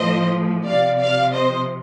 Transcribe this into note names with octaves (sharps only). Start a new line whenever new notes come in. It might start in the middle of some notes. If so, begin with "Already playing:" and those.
Already playing: A2 F3 C5 D#5
C3 F3 D5 F5
D5 F5
C5 D#5